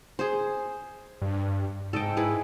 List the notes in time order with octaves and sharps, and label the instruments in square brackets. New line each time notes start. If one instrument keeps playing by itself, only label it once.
[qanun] G#4 C5
[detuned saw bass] G2
[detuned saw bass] G#2 [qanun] A4 D#5 G5
[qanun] E4 G#4 B4